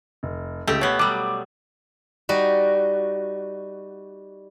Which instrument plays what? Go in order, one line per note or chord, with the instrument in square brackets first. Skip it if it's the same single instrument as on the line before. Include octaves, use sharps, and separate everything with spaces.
[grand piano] F1
[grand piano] C#2 [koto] A3 G4
[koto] B2 B3 [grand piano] C#5
[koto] F#3 G3 [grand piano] D6
[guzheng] G3 D#4 F#4